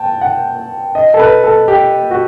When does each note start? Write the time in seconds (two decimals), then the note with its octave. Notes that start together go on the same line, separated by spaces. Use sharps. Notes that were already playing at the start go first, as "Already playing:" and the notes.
Already playing: G5 A5
0.21 F#5
0.95 D#5
1.14 A4
1.19 B4
1.44 A4
1.68 G4
2.11 F#4